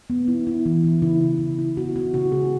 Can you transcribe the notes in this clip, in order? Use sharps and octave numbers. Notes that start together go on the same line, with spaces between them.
B3
E4
E4
E3
E3
C#3 E4
E4
C#3
E4
B3 F#4
B3 F#4
C#3 F#4
C#3 G#4